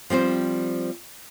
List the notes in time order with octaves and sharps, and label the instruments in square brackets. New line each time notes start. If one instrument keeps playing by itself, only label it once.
[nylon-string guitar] F3 G3 C4 C5